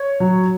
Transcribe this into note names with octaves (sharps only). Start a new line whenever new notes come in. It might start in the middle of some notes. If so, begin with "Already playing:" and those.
Already playing: C#5
F#3